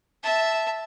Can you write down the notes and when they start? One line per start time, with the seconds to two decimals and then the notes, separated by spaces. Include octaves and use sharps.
0.23 E5 A5